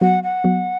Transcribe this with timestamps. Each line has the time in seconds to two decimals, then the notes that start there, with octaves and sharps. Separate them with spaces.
0.01 F#3 B3 F#4 F#5
0.23 F#5
0.44 F#3 B3 F#4